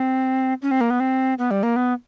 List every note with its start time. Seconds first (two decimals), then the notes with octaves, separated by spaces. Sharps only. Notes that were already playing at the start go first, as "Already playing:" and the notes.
Already playing: C4
0.62 C#4
0.71 C4
0.81 A#3
0.90 B3
1.00 C4
1.39 B3
1.51 G3
1.63 A#3
1.76 B3